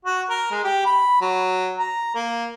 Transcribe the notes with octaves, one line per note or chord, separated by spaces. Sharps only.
F#4
A#4
G#3
G4
B5
F#3
A#5
A#3